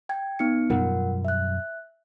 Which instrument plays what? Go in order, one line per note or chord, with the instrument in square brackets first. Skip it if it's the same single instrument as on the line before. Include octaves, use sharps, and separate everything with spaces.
[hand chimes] G5 G#6
B3 D#4 C#7
[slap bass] F#2 B2 G3 [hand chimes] F4 A#4 F#5
[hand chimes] E5 F#6